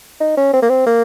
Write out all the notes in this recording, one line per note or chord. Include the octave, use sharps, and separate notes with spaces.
D#4
C#4
C4
A#3
C4
A#3